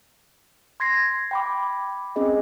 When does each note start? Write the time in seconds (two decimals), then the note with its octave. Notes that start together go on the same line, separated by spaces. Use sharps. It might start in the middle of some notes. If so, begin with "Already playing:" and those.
0.80 C6 G#6 A#6 C7
1.31 G5 B5 D6
2.16 C4 C#4 G#4 D#5